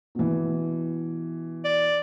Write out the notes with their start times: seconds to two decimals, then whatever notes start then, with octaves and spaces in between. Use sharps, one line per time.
0.15 B2 E3
1.64 D5